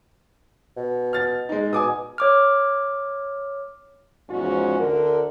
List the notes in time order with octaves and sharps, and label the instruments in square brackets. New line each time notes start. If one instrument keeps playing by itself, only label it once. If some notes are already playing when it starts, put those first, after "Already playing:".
[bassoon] B2
[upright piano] F6 A6
G#3 D#4
[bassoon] B2 [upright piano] G#5 D6 D#6
[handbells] C#5 D6 F6
[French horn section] E2 G#2 F3 G#3 C#4 F#4
D2 D3 A4 A#4